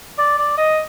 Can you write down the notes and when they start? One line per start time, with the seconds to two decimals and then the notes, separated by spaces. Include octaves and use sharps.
0.18 D5
0.39 D5
0.58 D#5